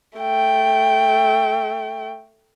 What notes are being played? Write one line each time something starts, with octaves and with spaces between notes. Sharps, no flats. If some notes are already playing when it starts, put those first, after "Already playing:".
A3 G5